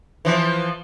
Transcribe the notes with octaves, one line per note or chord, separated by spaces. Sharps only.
E3 F3